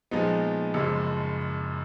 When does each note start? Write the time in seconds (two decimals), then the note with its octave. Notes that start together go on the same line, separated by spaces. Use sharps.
0.11 A#2 F3 G#3 B3 D#4
0.74 F#1 F#2 F3 G#3